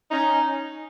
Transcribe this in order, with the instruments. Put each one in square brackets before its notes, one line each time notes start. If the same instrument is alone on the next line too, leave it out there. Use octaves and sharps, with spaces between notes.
[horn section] C#4 D#4